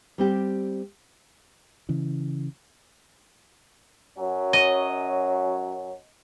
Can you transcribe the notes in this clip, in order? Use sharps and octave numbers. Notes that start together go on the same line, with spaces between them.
G3 C4 G4
C#3 E3
F#2 F#3 C#4
D#5